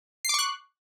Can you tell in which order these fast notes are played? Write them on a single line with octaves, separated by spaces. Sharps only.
C7 D6 C#6 F#6